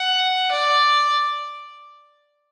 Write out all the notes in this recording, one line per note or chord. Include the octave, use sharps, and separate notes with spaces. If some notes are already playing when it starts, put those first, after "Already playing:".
Already playing: F#5
D5